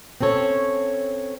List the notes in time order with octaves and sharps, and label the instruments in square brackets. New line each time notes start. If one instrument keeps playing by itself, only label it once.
[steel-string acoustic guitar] C4 C#4 A4 C#5